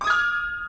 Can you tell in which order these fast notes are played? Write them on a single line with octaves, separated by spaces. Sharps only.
D6 D#6 G#6 F6